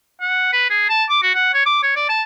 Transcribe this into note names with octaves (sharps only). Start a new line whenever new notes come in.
F#5
B4
G#4
A5
D6
F#4
F#5
C#5
D6
C#5
D5
A5